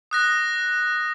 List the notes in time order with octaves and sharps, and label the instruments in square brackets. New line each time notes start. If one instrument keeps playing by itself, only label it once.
[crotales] D#6 F#6 A#6